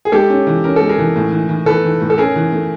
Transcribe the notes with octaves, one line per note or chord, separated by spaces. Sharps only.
G#4
G#3 G4 A4
C#4
E3
C#4 A#4
G#3 A4
G#4 A#4
E3
A2
E3
E3
E3 A4 B4
E3
A2
A4
C#4 G#4 A#4
E3
A3